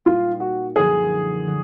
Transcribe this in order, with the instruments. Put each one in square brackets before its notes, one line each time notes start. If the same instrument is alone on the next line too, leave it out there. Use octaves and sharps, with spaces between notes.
[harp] A#2 G3 A#3 D#4 [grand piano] F4
[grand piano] F#4
[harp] F#2 D3 F3 A#3 D#4 [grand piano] G#4
[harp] D3 F#3